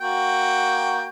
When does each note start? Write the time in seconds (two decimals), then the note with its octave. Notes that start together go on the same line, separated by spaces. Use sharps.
0.01 A#3 F#4 G5